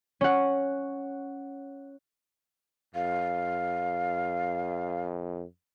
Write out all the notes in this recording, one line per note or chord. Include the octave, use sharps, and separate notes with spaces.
C#4 F#5
F2 F5